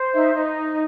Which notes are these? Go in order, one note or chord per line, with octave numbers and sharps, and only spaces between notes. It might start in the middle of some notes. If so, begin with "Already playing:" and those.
Already playing: C5
D#4 E5
D#4